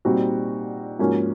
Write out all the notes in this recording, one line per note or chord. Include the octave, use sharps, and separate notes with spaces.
A#2 G3 C4 D#4 F#4
G#2 F3 A#3 C#4 F#4